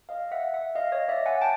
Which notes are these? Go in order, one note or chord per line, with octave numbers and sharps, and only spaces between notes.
D#5 F5
E5 F#5
E5 F#5
D#5 F5
C#5 D#5
D5 E5
F#5 G#5
G5 A5